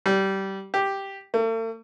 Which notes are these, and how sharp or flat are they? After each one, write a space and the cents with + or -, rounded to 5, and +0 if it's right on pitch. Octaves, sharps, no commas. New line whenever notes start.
G3 -20
G4 +0
A3 +45